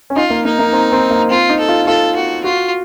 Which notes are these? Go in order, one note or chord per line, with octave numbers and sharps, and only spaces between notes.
C#4
D#4 F4
A#3
A#3 D#4
A#3
C4
C4
A#3
C4 F4
D#4
A4
F4
F4 A4
F#4
F4 F#4